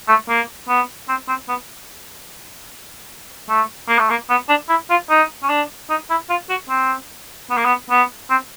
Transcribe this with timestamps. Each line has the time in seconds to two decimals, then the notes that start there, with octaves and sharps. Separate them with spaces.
0.08 A3
0.29 A#3
0.68 B3
1.08 C4
1.28 C4
1.48 B3
3.49 A3
3.89 A#3
3.99 A3
4.10 A#3
4.30 B3
4.49 D4
4.69 E4
4.90 F4
5.10 D#4
5.43 C#4
5.49 D4
5.90 D#4
6.10 E4
6.30 F4
6.49 F#4
6.69 C4
7.50 B3
7.57 A#3
7.65 B3
7.90 B3
8.30 C4